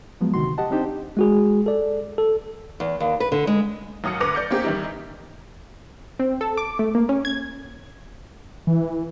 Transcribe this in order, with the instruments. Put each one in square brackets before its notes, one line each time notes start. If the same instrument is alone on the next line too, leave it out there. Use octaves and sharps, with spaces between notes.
[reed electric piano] F3 F#3 G#3 B3
D2 C3 D#3 F#4 C6
G4 D#5 F#5 A5
C4 D4 D#4 G4 C5
[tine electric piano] G#3 F#4 G#4
A4 D5
A4
[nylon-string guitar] E2
D#2
B4
D3
G#3
[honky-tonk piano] D#2 F#3 D#6 F6 C#7
D2 B4 D6 A#6 C#7 F7
D5 G6 C#7
A#3 C4 G4 G#4
D#3 E3 G3 D#4 E4
[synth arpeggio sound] C4
A4
D6
A3
A#3
C#4
G#6
[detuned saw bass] E3